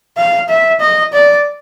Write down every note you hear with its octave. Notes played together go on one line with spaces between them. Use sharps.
F5
E5
D#5
D5